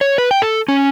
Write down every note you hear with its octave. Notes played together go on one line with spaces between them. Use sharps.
C#5
B4
G5
A4
C#4